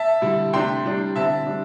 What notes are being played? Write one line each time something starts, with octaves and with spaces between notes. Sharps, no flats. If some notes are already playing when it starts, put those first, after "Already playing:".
Already playing: E5 A5
D3 G3 E4
C3 A3 D4 G5 C6
A2 G3 D4
D3 C4 E4 E5 A5
G3 D4